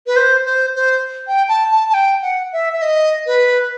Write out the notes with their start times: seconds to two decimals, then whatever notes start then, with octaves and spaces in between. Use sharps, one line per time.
0.07 B4
0.16 C5
0.45 C5
0.75 C5
1.27 G5
1.48 A5
1.71 A5
1.89 A5
1.94 G5
2.22 F#5
2.53 E5
2.73 E5
2.82 D#5
3.26 B4